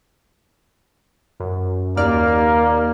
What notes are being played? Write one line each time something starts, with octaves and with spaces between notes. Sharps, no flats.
F#2
D#2 A#3 D5 F6